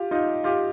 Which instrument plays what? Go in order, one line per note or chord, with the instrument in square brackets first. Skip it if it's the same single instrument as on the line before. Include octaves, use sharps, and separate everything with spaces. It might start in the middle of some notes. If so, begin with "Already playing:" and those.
Already playing: [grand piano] F4 G4
D#4 F4
F4 G4